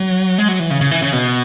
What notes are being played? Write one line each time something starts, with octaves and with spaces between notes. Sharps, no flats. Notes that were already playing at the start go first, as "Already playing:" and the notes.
Already playing: F#3
G#3
F#3
E3
C#3
C#3
E3
C#3
B2